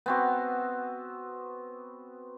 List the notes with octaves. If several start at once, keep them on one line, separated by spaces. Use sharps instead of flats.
B3 C4 F#4